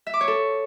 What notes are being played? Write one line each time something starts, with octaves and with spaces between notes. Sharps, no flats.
E5
D6
C#5
A4